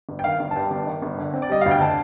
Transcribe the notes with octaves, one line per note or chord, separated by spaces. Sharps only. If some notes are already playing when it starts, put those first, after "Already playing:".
G1
G5
D#3 F5
G1
A5
G2 G5
G1
D#3
G1
D3
C4
D5
G3 D#5
D2 F5
G5
D3 A5